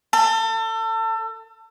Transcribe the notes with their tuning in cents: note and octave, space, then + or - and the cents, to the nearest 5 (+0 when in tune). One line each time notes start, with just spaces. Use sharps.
A4 +30